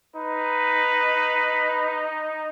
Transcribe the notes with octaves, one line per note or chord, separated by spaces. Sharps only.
D#4 B4